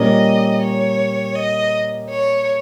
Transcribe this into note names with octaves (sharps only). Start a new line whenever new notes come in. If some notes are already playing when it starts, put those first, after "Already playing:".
Already playing: A#2 G3 A#3 C#4 G4 D#5
C#5
D#5
C#5